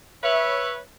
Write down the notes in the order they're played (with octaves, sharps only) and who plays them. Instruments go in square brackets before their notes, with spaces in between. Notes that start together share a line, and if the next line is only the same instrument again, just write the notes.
[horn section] B4 C#5 E5